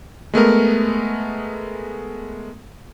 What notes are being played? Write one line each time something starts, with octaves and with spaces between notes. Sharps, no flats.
G#3 A3 B3 A#4